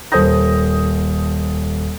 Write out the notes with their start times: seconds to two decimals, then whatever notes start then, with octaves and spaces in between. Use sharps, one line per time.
0.12 D#1 A4 C5 D#6 G6 A#6